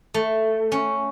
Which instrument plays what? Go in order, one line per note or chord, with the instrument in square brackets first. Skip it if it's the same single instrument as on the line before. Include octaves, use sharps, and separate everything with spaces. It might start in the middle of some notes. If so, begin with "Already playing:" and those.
[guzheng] A3
C#4